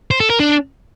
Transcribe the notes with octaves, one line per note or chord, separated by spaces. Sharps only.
C5
A4
A#4
D4